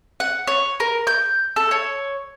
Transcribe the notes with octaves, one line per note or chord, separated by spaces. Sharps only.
F#5
C#5
A#4
G6
A4
C#5